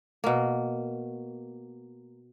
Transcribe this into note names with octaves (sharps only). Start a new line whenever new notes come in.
B2 A#3